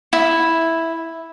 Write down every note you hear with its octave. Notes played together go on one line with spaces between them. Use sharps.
E4